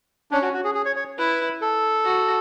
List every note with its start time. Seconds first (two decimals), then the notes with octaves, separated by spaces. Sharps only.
0.31 C#4 D4
0.42 F#4
0.53 F#4
0.64 G#4
0.75 G#4
0.85 C#5
0.96 C#5
1.18 E4 B4
1.62 A4
2.04 F#4